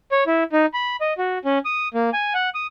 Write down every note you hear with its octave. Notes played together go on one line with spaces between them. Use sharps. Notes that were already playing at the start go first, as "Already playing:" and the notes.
C#5
E4
D#4
B5
D#5
F#4
C#4
D#6
A#3
G#5
F#5
D#6